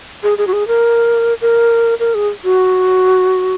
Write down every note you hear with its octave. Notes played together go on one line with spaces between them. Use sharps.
G#4
G#4
F#4
G#4
A#4
A#4
A#4
G#4
F#4